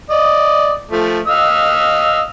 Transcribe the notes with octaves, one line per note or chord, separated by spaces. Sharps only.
D5 D#5
F3 A3
D#5 F5 E6